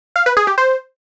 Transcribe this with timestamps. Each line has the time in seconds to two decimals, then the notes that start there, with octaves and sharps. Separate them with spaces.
0.16 F5
0.26 B4
0.37 G#4
0.47 G4
0.58 C5